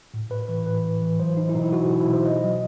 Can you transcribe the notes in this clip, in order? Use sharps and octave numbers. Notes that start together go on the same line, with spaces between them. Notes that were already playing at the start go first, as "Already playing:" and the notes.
A2
A2 B4
E3 B4
A2 B4
E3
E3
F#3 C5
F#3 D#4
E4
B2 D#4
E4
F#3 F#4
B2 G4
E4
B2
C5
B2 D#5
F#3